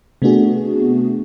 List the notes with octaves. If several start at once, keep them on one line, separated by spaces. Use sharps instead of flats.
C3 A3 B3 D4 F#4 G#4